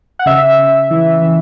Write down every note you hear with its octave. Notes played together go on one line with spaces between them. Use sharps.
F#5
C#3 E5
C#3
E3
E3